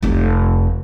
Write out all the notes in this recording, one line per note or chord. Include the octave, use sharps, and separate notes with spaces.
F1 D#4